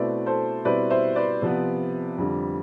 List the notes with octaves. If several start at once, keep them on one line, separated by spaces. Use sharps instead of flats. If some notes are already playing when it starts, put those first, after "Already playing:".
Already playing: B2 A3 C4 E4 B4 D5
A4 C5
B2 G3 C4 E4 B4 D5
C5 E5
B4 D5
C3 F3 B3
F2 D3 G3